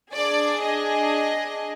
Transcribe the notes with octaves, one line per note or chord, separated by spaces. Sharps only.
D4 G#4 D5
D#5